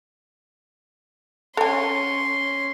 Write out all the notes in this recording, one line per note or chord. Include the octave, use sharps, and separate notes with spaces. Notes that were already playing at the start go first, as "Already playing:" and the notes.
C#4 A4 G#5 C6